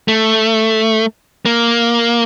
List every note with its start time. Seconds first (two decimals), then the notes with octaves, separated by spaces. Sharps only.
0.08 A3
1.46 A#3